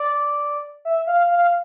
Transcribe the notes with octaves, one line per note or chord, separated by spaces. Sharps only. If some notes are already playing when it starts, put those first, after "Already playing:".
Already playing: D5
E5
F5
F5